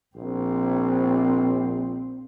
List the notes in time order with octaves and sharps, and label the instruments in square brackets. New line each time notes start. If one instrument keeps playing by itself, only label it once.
[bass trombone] A#1 [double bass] C4